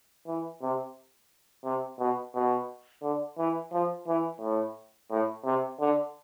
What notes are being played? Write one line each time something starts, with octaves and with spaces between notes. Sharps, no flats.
E3
C3
C3
B2
B2
D3
E3
F3
E3
A2
A2
C3
D3